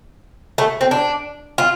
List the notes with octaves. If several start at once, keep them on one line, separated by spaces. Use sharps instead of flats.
A3
C4
D4
F4